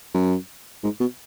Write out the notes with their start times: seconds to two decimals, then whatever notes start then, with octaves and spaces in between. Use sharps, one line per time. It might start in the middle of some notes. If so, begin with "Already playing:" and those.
0.14 F#2
0.84 G#2
1.00 B2